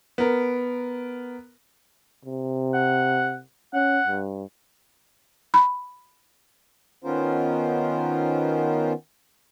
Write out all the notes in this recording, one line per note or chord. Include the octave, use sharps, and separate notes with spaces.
B3 A#4
C3
F#5
C#4 F#5
G2
B5
D#3 B3 C#4 F4 A#4 C5